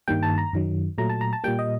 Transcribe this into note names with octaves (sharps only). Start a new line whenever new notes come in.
G2 D#3 G3 A#3 G5
A5
A#5
F#2 D#3 F#3
A#2 F#3 A3 A#5
A5
A#5
A5
A#2 G3 A#3 G5
D#5